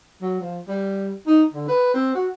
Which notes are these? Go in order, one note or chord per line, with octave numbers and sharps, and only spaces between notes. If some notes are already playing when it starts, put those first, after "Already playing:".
F#3
F3
G3
D#4
D3
B4
C4
F#4